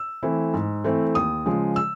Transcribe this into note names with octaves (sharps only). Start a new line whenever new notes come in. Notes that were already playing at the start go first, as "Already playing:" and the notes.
Already playing: E6
E3 A3 C4 E4
G#2
E3 A3 C4 E4
D#2 D#6
C#3 F3 G#3
E6